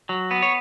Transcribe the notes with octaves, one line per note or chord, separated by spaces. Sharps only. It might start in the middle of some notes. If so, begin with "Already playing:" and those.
F#3
B3
C#5